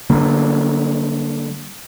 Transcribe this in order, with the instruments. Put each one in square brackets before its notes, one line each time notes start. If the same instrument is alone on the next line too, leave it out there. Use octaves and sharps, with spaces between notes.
[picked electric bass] D3 G3 A#3